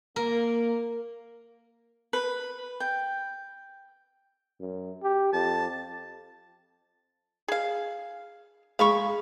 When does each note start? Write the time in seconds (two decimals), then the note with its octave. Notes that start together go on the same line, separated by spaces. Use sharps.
0.16 A#3 A#4
2.13 B4
2.80 G5
4.60 F#2
5.03 G4
5.33 F2 A5
7.48 G#4 F5
8.79 G#3 F5 B5 C#6